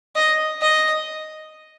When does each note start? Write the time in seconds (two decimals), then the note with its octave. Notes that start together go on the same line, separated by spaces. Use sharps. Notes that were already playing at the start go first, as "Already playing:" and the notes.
0.16 D#5
0.62 D#5